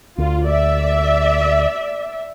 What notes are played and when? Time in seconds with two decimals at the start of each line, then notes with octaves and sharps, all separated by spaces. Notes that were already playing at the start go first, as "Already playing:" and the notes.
0.18 D2 F4
0.48 D5 E5